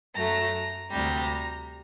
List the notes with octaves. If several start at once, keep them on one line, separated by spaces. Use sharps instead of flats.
F#2 F#3 A3 A#5
D2 C3 G3 A#5